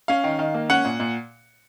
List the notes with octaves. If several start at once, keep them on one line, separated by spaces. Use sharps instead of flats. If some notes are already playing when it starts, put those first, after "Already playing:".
C#4 F5
D#3
D#3
A#3
C#4 F#5
A#2
A#2